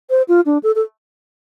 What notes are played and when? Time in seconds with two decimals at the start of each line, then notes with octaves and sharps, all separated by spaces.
0.10 C5
0.28 F4
0.46 D4
0.63 A4
0.76 A4